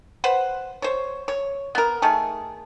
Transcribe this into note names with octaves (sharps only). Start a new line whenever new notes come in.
B4 C5 F#5
C5 C#5
C#5
B3 A#4
D#3 A3 G#4